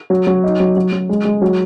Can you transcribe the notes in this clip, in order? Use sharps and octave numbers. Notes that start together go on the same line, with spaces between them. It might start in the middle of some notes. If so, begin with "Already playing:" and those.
F#3
F#3
D#4
F#3
F#3
F#3
G#3
G#3
F#3